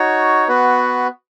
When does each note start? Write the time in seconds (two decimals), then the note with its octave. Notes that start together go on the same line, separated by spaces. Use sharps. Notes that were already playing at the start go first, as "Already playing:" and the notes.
Already playing: D#4 F#4 C#5
0.48 B3 F#4 B4